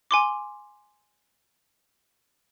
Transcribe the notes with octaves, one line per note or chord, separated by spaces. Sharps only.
G#5 C6 D6